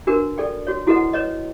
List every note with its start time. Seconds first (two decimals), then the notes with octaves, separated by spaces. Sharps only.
0.07 D4 F#4 A#4 B4
0.38 A4 D5 G5
0.67 F#4 C#5
0.87 E4 F#4 A4 B4 D#5 F#5
1.13 B4 C#5 D#5